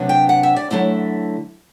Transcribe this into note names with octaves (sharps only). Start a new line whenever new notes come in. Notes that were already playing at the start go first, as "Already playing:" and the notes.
Already playing: C3 F#3 B3 D4
G5
F#5
E5
D5
D3 F#3 A3 C4 E4